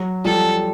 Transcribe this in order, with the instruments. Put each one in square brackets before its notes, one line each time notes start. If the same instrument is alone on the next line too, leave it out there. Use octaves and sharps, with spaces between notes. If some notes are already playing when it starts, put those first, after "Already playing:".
Already playing: [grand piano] F#3
[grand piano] F3 G3 [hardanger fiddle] A4